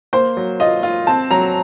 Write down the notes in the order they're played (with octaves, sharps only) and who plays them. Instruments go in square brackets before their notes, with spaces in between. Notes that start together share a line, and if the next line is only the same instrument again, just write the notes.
[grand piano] A#3 [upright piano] C5
[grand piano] F#3
[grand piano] F4 [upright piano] D#5
[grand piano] F4
[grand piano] C4 [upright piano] A5
[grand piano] F#3 [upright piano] A#5